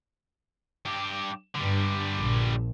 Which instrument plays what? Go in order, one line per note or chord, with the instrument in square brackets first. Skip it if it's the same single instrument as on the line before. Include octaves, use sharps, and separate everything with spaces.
[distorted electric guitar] G2 G4
[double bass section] G2 [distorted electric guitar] D3 G3
[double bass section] A#1